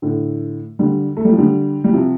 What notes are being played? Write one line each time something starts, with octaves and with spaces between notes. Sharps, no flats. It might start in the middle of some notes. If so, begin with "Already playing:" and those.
A2 D3
D3 G3
A3
G3
F3
D3 G3
G3
C3 F3